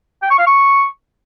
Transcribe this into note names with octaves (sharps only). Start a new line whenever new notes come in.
G5
C#6
F5
C#6